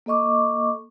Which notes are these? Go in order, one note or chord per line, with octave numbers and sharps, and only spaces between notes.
A#3 A4 D#5 C#6 D6